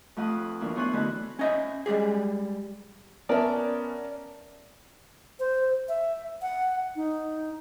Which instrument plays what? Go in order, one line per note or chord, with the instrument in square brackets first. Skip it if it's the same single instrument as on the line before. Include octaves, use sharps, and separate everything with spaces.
[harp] F2 A3 F4 F#5 D#6
B4
F#2 E3 A#3 D4
B3 E4 C5 C#5 G#5 F#6
D3 A3 D4 D#4 F#4 B4
[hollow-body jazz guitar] C#4 D#5 E5
G3 G#3 G4 G#4
[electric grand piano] B3 C#4 [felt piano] A#4 E5 A5 [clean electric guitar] D5
[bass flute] C5
E5
F#5
D#4